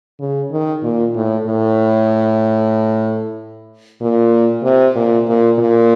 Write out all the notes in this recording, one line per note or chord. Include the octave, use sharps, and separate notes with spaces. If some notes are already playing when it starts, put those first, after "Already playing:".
C#3
D#3
A#2
A2
A2
A#2
C3
A#2
A#2
A#2